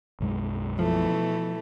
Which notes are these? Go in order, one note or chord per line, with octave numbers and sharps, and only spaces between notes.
B1 F#2 G#3
B2 E3 F3 A3